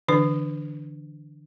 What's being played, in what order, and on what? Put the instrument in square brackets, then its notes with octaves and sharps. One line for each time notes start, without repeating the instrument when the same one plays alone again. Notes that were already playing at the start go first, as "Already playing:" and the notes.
[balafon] D3 E3 D4 B4